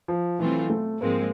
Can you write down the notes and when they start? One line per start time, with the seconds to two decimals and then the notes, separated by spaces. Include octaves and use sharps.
0.08 F3
0.39 B2 E3 F#3 A3 C4 F4
0.70 A3
1.01 G#2 F3 G#3 A#3 C4